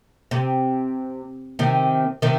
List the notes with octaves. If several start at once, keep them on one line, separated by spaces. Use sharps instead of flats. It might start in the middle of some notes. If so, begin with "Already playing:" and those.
C3
C3 D#3
C3 D#3